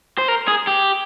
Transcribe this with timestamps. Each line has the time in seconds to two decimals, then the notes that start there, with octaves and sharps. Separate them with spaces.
0.18 C5
0.28 A#4
0.48 G#4
0.67 G4